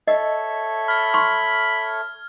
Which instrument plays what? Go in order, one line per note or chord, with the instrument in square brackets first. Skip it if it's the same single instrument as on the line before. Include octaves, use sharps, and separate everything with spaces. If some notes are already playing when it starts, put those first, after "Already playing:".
[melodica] A4 C#5 E5 [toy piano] D#5
[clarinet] B5 [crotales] F6 G#6
[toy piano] C6 C#6